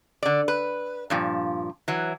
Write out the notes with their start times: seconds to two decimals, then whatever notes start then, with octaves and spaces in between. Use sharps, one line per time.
0.23 D3 D5
0.48 B4
1.10 G2 A#2 F3
1.88 E3 F#3